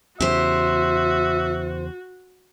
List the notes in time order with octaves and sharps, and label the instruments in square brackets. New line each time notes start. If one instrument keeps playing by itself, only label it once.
[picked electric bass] E2 C#3 [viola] F#4 [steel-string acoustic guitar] G4 C5 [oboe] E5